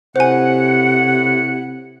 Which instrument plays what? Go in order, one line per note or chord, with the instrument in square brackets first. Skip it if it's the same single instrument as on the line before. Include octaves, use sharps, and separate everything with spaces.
[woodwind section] A2 E4 F#5 [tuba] C3 [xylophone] C5 G#5